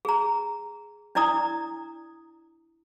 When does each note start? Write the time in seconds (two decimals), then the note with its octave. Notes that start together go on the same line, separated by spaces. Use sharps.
0.05 G#4 A#5
1.15 D4 E4 D5 A#5 D#6